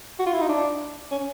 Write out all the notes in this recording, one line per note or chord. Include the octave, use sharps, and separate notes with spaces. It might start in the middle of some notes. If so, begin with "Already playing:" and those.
F#4
F4
E4
D#4
D4
C#4